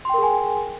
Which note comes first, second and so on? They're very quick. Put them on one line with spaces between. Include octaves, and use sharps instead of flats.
C6 G5 A#4 G#4 G#5